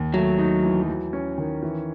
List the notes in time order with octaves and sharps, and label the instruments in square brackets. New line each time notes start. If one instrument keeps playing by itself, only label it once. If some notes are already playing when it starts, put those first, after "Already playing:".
Already playing: [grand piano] D#2
[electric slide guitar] F#3 [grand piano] A3
[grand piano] D#4
E3
F#3
C#4
D#3
E3